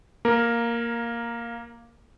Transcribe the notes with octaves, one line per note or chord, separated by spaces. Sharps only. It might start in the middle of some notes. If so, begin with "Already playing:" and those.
A#3 A#4